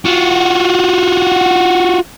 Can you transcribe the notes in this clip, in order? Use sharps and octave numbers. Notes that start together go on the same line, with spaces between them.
F4 F#4